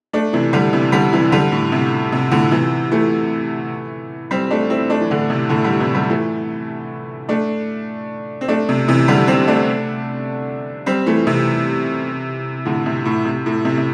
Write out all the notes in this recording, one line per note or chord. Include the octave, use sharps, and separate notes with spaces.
A3 D4
C3 E3
D3 G3
C3 E3
D3 G3
C3 E3
D3 G3
A2
C3
C3
A2 D3
C3 E3
E3 A3
G3 C4
A3 D4
C4 E4
A3 D4
E3
A2 D3
C3
A2 D3
D3 G3
C3 E3
D3 G3
E3 A3
A3 D4
C4
A3 D4
C3
C3 E3
D3 G3
G3 C4
A3 D4
G3 C4
E3 A3
C3 E3
A2 D3
C3
A2
C3
A2
C3
C3